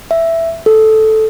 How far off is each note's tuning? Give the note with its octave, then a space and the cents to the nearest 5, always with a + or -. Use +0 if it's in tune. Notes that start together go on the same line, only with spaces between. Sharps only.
E5 +5
A4 -5